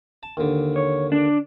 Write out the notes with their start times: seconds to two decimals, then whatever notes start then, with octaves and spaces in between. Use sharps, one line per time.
0.23 A5
0.37 D#2 D3
0.76 C#5
1.12 D4